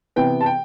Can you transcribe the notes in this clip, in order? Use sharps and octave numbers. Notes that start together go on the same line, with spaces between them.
C3 E3 B3 G5
A5
G5